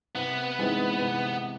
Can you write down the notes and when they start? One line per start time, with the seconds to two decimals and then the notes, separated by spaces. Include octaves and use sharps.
0.15 C3 B3
0.59 E3 G#3 C4 D#4
1.01 C3